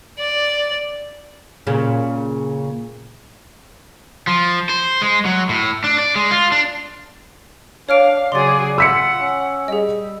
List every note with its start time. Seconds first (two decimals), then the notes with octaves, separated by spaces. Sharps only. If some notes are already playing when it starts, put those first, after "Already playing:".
0.19 D5
1.67 A#2 C#3
4.27 F3
4.69 C5
5.02 G#3
5.25 F#3
5.49 A2
5.84 D4
5.99 D5
6.15 G#3
6.31 F4
6.52 D4
7.89 D4 C#5 F5 F6 D7
8.32 C#3 F#3 G#4 D5 C6 A6
8.78 F4 F#5 E6 B6 C#7
9.20 C#4
9.68 G3 G#4 D#5